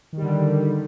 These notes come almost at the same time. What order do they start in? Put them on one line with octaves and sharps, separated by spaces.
D#3 G3 D3